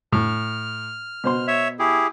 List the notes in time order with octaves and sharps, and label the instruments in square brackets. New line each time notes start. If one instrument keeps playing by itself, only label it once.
[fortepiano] A2 [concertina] F6
[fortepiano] B2 C5 C6
[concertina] C#5 E5
E4 G4 G#4